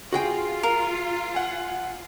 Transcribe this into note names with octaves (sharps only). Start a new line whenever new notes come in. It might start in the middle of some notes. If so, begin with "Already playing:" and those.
F4 F#4 G#4 G5
A#4
F#5 G#5